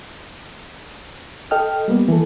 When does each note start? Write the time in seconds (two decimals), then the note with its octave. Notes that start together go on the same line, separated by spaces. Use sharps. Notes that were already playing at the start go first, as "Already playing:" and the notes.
1.51 A4 D#5 G5 F6
1.88 G3 A#3 B3
2.08 E3 A4